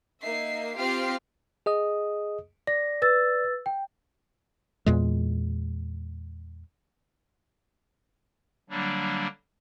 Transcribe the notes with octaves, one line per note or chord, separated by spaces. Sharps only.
A#3 D#4 E5 C7
C4 F4 G4 F6 C7
G#4 D#5 D#6
D5 A#6
B4 E6 A6
G5
E2 A#2 G#3
D3 F#3 G3 A#3 D4